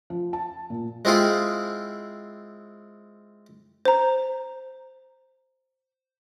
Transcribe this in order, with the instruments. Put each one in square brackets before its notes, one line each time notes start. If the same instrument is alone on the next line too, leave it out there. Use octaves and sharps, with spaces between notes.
[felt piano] F3
A5
A#2
[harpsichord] G#3 C4 E4 F4 G#4
[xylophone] C5 A#5